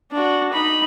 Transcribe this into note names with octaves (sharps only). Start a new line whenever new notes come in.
D4 F#4
D#4 B5